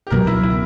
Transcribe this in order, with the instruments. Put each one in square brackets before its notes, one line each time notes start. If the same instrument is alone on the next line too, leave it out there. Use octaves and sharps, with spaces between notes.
[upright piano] G4
[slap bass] C#2 B2 F#3 B3 [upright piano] A#4
[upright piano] E4
E4